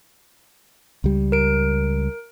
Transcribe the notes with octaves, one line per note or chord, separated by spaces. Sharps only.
C#2 G3
A#4 D7